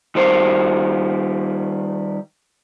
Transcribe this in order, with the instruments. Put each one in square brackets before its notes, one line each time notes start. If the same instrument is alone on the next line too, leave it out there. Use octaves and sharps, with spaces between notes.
[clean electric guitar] D#3 G3 C5